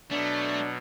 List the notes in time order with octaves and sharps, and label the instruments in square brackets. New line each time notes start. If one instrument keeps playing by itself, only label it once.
[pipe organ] B2 F#3 [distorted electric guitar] A3 [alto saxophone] D4